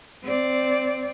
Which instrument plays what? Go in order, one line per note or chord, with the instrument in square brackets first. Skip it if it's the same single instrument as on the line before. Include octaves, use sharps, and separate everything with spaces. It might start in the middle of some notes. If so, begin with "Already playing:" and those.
[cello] C4 D5